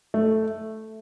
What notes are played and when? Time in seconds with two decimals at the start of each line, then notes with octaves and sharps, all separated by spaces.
0.14 A3